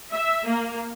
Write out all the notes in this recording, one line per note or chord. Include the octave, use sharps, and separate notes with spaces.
E5
A#3